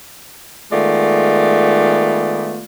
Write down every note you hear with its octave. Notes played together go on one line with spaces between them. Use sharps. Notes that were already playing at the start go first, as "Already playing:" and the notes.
D#3 G#3 A3 B3 F4 D5